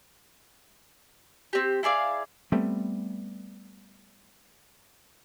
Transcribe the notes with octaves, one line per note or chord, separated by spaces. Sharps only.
C4 G4
E4 G#4 D5 F5
G3 A3 B3 C4